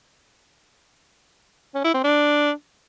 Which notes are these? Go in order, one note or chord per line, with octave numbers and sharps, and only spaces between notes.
C#4
E4
C4
D4